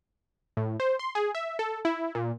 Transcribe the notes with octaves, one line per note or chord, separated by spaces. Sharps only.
A2
C5
C6
G#4
E5
A4
E4
A#2